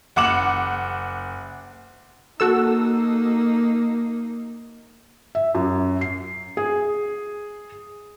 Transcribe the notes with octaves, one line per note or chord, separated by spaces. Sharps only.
F#1 F#5 D6 E7 F#7
A#3 D#4 F#4 A4 E6
E5
F#2
C7
G#4